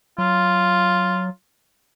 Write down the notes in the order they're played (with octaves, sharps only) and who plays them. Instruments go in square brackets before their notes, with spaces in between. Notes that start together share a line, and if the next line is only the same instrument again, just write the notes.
[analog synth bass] F#3 [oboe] F4